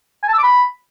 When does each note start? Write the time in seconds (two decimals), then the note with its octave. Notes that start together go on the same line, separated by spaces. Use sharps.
0.23 G#5
0.28 A5
0.33 E6
0.38 D6
0.43 B5